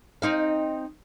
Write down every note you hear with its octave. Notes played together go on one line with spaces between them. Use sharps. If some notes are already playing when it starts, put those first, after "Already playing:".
C4 D#4 F5